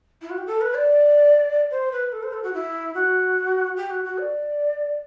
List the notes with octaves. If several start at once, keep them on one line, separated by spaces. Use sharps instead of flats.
E4
F#4
G4
A4
B4
D5
C5
B4
A4
C5
A4
F#4
E4
F#4
G4
F#4
F#4
D5